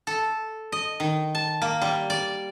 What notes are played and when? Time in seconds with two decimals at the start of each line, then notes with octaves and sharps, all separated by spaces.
0.07 A4
0.72 D#5
1.00 D#3
1.35 A5
1.62 A#3
1.82 G3
2.10 D5